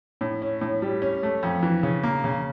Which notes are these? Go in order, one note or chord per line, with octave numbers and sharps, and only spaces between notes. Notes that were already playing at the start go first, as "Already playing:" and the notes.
A2
C#4
A2
G3
C#4
A3
F2
E3
C#3
A#3
C#3